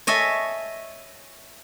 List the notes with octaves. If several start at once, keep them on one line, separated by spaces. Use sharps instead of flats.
C#5 D#5 E5 G#5 A5